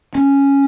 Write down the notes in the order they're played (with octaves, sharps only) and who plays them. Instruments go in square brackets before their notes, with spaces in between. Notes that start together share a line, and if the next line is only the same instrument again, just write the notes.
[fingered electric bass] C#4